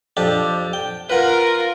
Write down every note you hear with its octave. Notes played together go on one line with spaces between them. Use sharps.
F2 D4 G4
G5
F4 A#4 B4 F#5